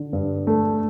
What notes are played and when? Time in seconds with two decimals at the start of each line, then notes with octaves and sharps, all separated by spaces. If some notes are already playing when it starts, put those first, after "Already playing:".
Already playing: D3
0.13 G2
0.47 A3